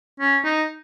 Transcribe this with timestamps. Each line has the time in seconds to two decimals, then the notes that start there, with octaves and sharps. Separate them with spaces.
0.20 C#4
0.45 D#4